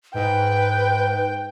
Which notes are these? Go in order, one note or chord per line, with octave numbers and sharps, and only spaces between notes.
G#2 B4 G5